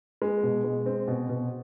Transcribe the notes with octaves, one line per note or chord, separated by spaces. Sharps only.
G#3
B2
G#3
C4
B2
B2